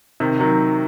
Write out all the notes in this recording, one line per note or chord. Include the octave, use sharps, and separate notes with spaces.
C3 D#3
D#3 F#3